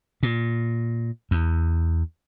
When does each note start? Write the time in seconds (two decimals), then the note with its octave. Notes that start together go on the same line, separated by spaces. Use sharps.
0.23 A#2
1.31 E2